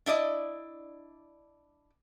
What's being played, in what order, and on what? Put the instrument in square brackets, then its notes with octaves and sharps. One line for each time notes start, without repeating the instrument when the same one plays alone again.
[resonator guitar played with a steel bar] D4 E4 D5 D#5